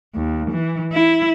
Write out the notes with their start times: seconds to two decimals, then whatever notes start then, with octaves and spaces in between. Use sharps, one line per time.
0.15 D#2
0.51 E3
0.92 E4